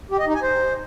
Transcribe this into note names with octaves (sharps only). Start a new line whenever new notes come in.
G4
D#5
D#4
G#5
C5